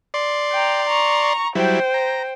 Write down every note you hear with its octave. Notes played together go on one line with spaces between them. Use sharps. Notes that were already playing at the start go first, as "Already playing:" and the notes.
D5 C6
G5 A#5
A#5 C#6
F#3 G3 E4 C5 G5
A#5